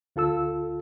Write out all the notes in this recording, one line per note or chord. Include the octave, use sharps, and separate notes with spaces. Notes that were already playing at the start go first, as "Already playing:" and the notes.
D2 F4 A4 E6